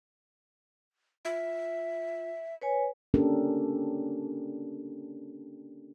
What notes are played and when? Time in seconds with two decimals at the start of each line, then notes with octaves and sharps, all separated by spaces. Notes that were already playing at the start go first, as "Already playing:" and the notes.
1.25 F4 E5
2.61 B4 C#5 G#5
3.14 A#3 C#4 D4 G4 A4 A#4